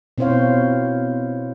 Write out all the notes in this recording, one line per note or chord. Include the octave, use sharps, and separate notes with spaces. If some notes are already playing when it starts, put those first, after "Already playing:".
B2 C4 E4 C5 C#5 F5